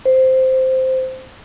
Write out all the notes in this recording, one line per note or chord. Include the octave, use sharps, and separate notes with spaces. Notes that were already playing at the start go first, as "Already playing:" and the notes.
C5